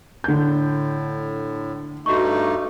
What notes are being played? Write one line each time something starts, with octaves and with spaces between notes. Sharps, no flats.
A2 D3 G6
G2 A3 D#4 F#4 C#6